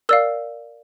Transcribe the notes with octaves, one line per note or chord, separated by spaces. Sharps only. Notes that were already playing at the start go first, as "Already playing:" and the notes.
A#4 D5 F5 E6